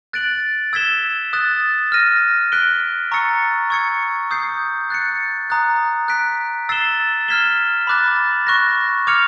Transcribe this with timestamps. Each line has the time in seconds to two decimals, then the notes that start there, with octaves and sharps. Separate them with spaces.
0.13 F#6 A6 D7 F#7
0.73 E6 G#6 B6 E7 G7
1.33 D#6 F#6 A6
1.92 F6 A#6 D#7
2.52 F#6 B6 D7 G7
3.12 A#5 C#6 E6 A6 C#7
3.70 C#6 E6 G#6 C#7
4.31 D#6 G6 C7
4.90 F#6 A6 C#7
5.50 A#5 D#6 F#6
6.08 F#6 B6 D7
6.69 E6 A6 C7 E7 G7
7.28 F6 G#6 B6 E7 G7
7.87 B5 D6 F#6 A6
8.47 C#6 F#6 A#6
9.07 D6 F6 G#6 C#7 F7